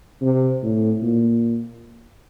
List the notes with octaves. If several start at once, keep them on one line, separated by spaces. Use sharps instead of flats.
C3
A2
A#2